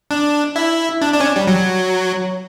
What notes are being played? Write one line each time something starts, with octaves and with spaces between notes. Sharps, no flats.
D4
E4
D4
D4
C#4
D4
G3
F#3